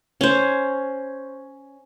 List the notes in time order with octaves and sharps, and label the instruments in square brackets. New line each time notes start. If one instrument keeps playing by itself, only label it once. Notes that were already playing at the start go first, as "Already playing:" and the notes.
[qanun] C#4 C5